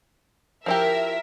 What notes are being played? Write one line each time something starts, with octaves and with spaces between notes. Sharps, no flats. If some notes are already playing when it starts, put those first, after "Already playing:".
F3 E4 G4 A#4 E5